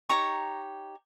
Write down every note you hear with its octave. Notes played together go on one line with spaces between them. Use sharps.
D#4 G4 C#5 A#5 C#6